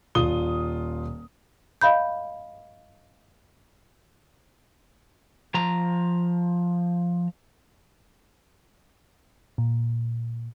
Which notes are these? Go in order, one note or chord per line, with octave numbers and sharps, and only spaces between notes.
D#1 F4 D#6 G7
D#5 F5 B5 G6
F3 A#5
A#2